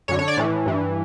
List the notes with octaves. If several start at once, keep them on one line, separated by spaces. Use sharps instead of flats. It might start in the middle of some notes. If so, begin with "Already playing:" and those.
F#2 D3 C#5
C#5
D5
A2 E3
G2 E3